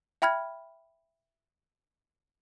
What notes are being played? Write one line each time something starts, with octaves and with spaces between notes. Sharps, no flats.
E5 G5 B5 F6 G#6